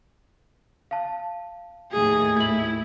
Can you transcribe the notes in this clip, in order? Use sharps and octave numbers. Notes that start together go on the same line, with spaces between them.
F5 A5
D#2 A2 A3 G#4
E4 G#6 F#7